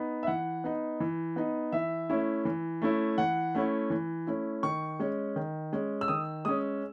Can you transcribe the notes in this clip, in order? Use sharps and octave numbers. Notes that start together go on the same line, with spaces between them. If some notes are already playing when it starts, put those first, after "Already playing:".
Already playing: B3 D#4
E5
E3 F#5
B3 D#4
E3
B3 D#4
E3 E5
A3 C#4 E4
E3
A3 C#4 E4
E3 F#5
A3 C#4 E4
E3
A3 C#4 E4
D#3 C#6
G#3 C#4
D#3
G#3 C#4
E6
D#3 D#6
G#3 C#4 D#6